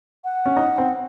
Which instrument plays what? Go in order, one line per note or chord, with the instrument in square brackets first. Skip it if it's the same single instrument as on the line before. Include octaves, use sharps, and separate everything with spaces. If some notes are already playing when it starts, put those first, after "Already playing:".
[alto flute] F#5
[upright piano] C#4
D#4
C4